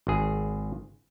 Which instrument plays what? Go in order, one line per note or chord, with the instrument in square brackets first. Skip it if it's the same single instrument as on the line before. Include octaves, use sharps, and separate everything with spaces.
[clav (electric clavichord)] G#1 G#4